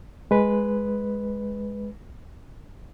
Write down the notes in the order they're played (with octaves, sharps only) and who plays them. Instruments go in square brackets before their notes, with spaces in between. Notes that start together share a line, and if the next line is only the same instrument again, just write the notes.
[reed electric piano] G#3 B4